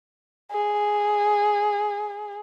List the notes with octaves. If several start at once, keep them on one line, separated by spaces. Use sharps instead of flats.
G#4